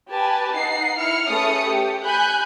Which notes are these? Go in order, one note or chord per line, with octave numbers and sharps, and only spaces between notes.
G4 B4 G#5 A5
D#4 F#5 C7
E4 F6 C#7
A3 C#4 G#4 B4 D#6 C#7
G4
G#5 B5 F#6 G6